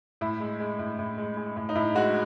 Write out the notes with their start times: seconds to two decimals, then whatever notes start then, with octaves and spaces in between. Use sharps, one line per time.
0.21 A2 E4
0.40 G#3
0.60 G#3
0.79 A2
0.99 A2
1.18 G#3
1.37 G#3
1.57 A2
1.69 D#4
1.75 A2 E4
1.95 G#3 F#4